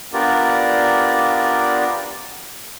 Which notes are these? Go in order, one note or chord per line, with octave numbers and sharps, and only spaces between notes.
B3 D4 F4 G4 A#4 D5